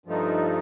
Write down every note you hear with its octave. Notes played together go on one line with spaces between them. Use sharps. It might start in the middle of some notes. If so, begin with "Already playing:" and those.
G2 F3 A3 D#4